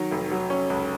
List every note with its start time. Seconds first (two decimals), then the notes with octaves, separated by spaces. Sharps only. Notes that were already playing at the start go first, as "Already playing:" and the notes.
Already playing: D#3 F#3
0.11 F1
0.31 F#3
0.50 C#4
0.70 C#2